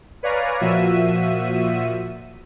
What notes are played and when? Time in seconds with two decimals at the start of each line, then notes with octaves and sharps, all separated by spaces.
0.23 B4 C#5 D5 F5 G#5 A#5
0.61 A#2 F3 F#4 E5 D#7